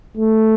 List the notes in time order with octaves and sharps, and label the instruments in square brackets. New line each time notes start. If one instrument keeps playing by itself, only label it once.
[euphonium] A3